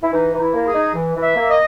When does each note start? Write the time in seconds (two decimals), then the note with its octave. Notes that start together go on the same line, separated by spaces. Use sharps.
0.03 E4
0.13 E3 D#4
0.34 E3
0.41 E4
0.54 A#3
0.67 G#4
0.74 D#4
0.95 E3
1.16 E3
1.23 E5
1.36 A#3
1.50 D#5